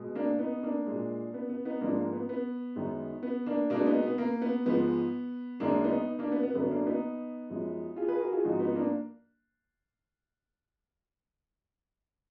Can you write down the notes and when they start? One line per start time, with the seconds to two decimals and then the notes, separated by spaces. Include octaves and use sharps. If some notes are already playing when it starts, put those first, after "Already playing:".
Already playing: B2 G#3
0.15 A#3 D4
0.39 B3 D#4
0.63 A#3 D4
0.86 A#2 G#3
1.34 B3
1.49 B3
1.65 B3 D#4
1.81 G#2 F3 G#3 A#3 D4
1.98 A#3
2.13 B3
2.29 B3
2.76 F#2 D#3 G#3
3.23 B3
3.46 A#3 D4
3.70 B2 G#3 A#3 D4
3.86 B3 D#4
4.02 B3
4.18 A#3
4.42 B3
4.65 G#2 F3 G#3 B3
5.60 F#2 D#3 G#3 A#3 D4
5.84 B3 D#4
6.19 A#3 D4
6.32 B3
6.43 B3
6.54 F#2 D3 F#3 B3
6.70 A#3 D4
6.86 B3 D#4
7.50 F#2 F3 G#3
7.96 F4 G#4
8.08 G#4 B4
8.20 F#4 A#4
8.32 F4 G#4
8.44 G#2 F3 G#3 D#4 F#4
8.60 B3 D#4
8.75 A#3 D4